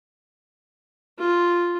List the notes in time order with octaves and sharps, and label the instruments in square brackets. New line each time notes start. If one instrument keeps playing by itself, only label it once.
[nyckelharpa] F4